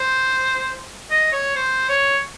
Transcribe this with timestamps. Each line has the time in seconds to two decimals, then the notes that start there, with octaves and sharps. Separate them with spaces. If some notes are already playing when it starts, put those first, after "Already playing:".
Already playing: C5
1.10 D#5
1.32 C#5
1.55 C5
1.89 C#5